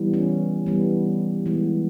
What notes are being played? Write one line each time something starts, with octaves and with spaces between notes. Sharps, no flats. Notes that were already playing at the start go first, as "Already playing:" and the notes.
Already playing: E3 G3 B3
C#4
E3 G3 B3
E3 G#3 B3